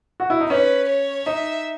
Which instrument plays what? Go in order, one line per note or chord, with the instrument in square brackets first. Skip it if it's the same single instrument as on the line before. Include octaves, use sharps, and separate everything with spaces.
[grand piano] F#4
E4
D#4
[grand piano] C#4 [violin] B4
[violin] C#5
[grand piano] D#4 [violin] E5